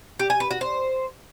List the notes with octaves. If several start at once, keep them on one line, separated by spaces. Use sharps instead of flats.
G4
G#5
B4
F#4
C5